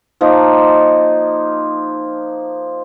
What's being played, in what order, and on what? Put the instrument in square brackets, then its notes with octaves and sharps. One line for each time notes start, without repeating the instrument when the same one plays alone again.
[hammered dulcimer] F3 A#3 D#4